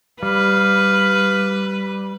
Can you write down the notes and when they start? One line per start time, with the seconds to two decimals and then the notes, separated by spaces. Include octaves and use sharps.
0.23 G3 B4 F5